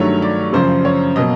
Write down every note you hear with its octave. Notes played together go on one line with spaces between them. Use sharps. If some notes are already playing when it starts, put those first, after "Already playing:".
Already playing: G2 D#3 F#3 A3 C#5
D5
F#2 C#3 F3 C5
C#5
B2 F#3 A#3 D#5